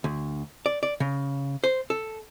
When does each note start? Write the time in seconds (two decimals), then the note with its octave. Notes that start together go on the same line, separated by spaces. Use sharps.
0.04 D2
0.66 D5
0.83 D5
1.00 C#3
1.64 C5
1.90 A4